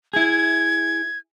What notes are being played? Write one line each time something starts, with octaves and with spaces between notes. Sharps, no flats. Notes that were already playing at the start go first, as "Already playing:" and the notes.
E4 G#4 G#6